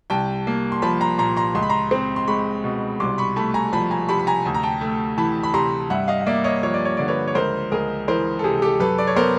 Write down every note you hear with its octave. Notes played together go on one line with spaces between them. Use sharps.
C2 G5 A5
A#3
C6
F3 A5 B5
A#5 C6
A#2 A#5 C6
A#5 C6
C#2 C6
B5
A#5 C6
C4
C6
G#3 B5 C#6
B2
C2 C6 D6
B5 C#6
A3 A5 B5
G#5 A#5
F3 A5 B5
G#5 A#5
C3 A5 B5
B5
G#5 A#5
D2 A5
A#5
G5 A5
A3
E3 A5 B5
B5
C3 A#5 C6
G2 E5 F#5
D#5 F5
F5
A#3 D5 E5
C#5 D#5
F3 C#5
D5
C#5
D3 D5
B4 C#5
C#5
C#2 A#4 C5
C#2 G#4 A#4
E3 A#4 C5
A4
C3 G#4
G4 A4
F#2 A4 B4
D5
C#5
B3 A#4 C5